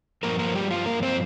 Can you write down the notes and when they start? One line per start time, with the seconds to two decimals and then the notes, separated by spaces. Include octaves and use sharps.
0.23 G2 F3 A#3 A#4
0.39 A#3 A#4
0.54 G3 G4
0.71 F4
0.86 A#3 A#4
1.02 C4 C5